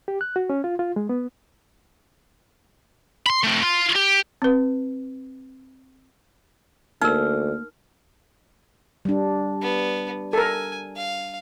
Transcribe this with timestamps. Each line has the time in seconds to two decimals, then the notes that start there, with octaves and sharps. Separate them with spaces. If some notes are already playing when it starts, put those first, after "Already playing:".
0.08 G4
0.21 F#6
0.36 F#4
0.50 C#4
0.64 F4
0.79 F4
0.96 G#3
1.09 B3
3.26 B5 C6
3.44 A3 C4
3.63 F4
3.96 G4
4.42 C4 B4
7.02 D2 A#3 D#4 A#4 F6
9.05 G3 D4
9.62 B3
10.33 A4 A#4 G#5
10.97 F5